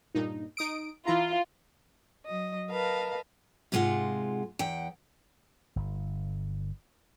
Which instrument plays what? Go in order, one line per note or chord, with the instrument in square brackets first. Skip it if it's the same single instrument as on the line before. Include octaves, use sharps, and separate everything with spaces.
[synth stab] G2 A#2 D#4
D#4 D#6 D7
[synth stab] E3 E4 A#5 [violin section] F4
[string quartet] F#3 D#5
A#4 B4 D#5 F5 A5
[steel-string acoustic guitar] G#2 C3 G#3 A3 F4 F#5
E2 F#5 G5
[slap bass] G1